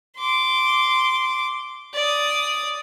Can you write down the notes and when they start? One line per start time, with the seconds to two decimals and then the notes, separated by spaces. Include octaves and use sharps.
0.18 C6 D6
1.94 D5 D#6